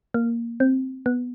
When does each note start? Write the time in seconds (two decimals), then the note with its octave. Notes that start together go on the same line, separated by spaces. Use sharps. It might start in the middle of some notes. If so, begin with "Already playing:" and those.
0.14 A#3
0.60 C4
1.06 B3